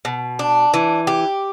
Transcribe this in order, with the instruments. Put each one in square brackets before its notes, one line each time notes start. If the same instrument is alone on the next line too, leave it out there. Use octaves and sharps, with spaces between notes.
[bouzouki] B2
D4
E3
G4